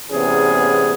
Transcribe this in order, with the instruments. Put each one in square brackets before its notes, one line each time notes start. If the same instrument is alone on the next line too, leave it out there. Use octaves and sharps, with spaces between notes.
[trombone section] E2 A2 C3 B3 C#4 G#4